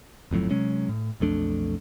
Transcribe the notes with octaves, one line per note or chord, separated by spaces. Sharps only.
G1 F2 A2 F#3
C3 F#3 G#3 C#4
A2
B1 F2 A3 D4